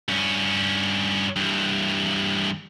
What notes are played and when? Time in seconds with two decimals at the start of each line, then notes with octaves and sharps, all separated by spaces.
0.08 G2 C#4
1.36 G2 E3